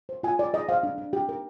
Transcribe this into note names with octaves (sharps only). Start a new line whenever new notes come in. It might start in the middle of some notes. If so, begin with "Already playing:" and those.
C5
F4 G#5
F4 D5
G#4 D#5
C5 F5
D4
D4
G4
A#4